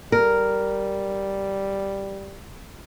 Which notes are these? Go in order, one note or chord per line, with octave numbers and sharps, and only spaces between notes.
G3 A#4